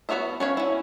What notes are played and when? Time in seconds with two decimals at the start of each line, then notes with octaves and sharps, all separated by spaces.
0.09 B3 F#4 C#5 D#5 E5
0.40 C#4 F#4 C#5 F5
0.57 C#4 E4